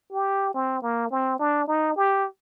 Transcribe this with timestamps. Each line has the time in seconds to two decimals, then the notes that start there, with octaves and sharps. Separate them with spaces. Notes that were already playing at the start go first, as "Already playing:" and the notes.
0.12 G4
0.54 C4
0.82 A#3
1.11 C4
1.39 D4
1.67 D#4
1.96 G4